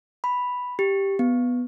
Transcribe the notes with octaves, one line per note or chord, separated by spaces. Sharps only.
B5
G4
B3